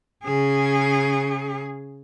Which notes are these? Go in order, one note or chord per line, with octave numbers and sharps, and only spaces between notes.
C#3 G#4